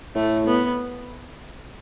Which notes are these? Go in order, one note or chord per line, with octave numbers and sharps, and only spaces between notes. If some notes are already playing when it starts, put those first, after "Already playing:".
A2 A3
B3